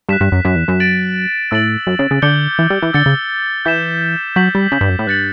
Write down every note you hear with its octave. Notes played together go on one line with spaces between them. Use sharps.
G2 F#6 B6 E7
G2
F#2
F#2
E2
F#2
A6 D7 F#7
A2 E6 A6 D7 F#7
F#2
C#3
C#3
D3 D6 G6 C#7 G7
E3
G3
E3
D3 E6 A6 C#7 G7
C#3
E3 G6 B6 E7
F#3 G6 B6 F#7
G3
C#3
G2
F#2
A2
G2 F#6 A6 C#7 F#7